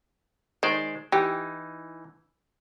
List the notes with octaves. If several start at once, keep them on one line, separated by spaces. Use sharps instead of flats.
D#3 G#3 C5 D5
E3 D#4 G4